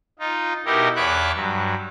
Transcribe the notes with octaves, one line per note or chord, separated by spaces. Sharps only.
D#4 F4
B2 D#4 E4 G4 A#4
E2 B4 C#5 E5 D6 F#6
G2 F#3